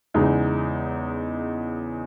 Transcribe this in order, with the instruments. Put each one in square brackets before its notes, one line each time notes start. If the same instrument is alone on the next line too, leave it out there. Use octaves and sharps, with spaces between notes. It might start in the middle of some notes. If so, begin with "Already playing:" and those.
[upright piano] E2 C#3 G#3 D#4